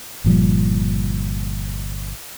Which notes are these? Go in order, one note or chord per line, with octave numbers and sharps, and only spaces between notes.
G1 A#2 F3 G3